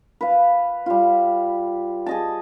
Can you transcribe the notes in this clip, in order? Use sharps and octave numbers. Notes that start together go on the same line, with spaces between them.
B4 F5
G3 F4
G#4 D#5 A5